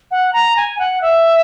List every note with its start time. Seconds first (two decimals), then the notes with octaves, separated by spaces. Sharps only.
0.11 F#5
0.33 A#5
0.56 G#5
0.79 F#5
1.02 E5